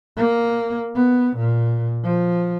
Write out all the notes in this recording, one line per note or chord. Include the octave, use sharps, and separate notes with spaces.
A#3
B3
A#2
F3